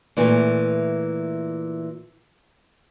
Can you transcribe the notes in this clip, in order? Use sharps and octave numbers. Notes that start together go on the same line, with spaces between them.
A#2 E3 A3